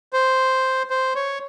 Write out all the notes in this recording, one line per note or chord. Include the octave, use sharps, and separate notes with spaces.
C5
C5
C#5